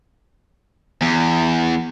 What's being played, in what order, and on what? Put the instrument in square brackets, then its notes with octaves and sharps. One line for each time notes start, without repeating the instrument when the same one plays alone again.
[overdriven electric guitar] E2